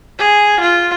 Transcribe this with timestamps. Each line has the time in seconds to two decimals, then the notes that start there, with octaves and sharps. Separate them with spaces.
0.18 G#4
0.60 F4